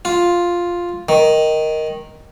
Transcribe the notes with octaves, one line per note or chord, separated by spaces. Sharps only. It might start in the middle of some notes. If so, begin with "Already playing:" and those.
F4
D#3